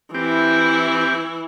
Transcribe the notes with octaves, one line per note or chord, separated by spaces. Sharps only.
E3 C4 E4 G4